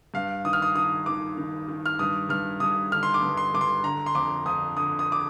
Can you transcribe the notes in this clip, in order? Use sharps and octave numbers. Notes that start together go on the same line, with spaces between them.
G2 F5
D#3 D#6
F6
D#6
D#3 D#6
D#3 D6
D#3
D#3
F6
G2 D#6
G2 F6
G2 D#6
D3 F6
C6
D6
G2
C6
G2 D6
C6
D3 A#5
C6
F2 D6
F2 D#6
D3 D#6
D#6
D6